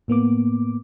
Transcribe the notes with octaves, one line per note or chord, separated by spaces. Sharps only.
A2 A#3 B3 D6